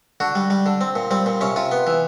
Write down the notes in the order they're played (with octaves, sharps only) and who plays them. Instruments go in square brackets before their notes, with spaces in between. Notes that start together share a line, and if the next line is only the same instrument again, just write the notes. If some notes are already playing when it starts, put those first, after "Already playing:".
[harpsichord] D3 F#4
G3
G3
D3
C4
A#2
G3 C4
A#2
C3 C#4
C3 F4
B3
E3